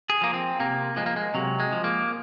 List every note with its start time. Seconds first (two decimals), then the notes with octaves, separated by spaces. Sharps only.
0.10 G#4
0.21 F3 A#3
0.34 C4
0.59 C3 A#3
0.96 F3 G#3
1.06 A#3
1.16 G#3
1.34 C3 F#3
1.60 G#3
1.72 F3
1.84 A#3